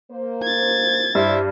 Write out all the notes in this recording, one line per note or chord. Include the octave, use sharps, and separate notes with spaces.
A#3 C5
G#6 A6
G2 E4 C5 E5